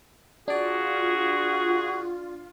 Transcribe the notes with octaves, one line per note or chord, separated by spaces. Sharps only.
D4 F4 F#4 G#4 D5